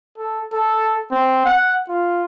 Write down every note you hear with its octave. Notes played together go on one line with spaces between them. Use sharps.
A4
A4
C4
F#5
F4